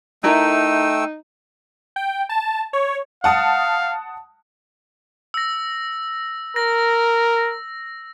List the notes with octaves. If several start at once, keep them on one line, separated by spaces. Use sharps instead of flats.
A3 D#4 E4 A4 A#4 G5 E6
G5
A5
C#5
F5 F#5 A5 D#6
E6 A#6
A#4 A#6